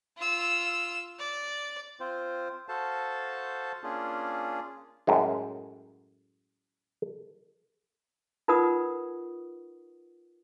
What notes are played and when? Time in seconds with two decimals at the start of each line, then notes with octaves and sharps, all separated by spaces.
0.18 F4 E6
1.19 D5
2.00 C4 F4 C5
2.69 F#4 A4 C5 F5 A5
3.83 A#3 C#4 D4 F4 G#4
5.07 F#2 A2 G#3
8.48 D#4 F4 A#4 B4 F#5 D#6